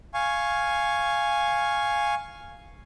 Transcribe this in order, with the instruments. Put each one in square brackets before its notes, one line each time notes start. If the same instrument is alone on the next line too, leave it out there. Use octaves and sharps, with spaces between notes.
[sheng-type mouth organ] F5 G#5 C#6